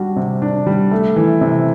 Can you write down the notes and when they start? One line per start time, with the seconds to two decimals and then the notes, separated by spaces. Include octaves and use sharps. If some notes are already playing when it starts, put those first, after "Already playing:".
Already playing: G3 D4 F#4
0.17 C3
0.42 D4
0.67 G3
0.91 A3
1.16 E3
1.41 C3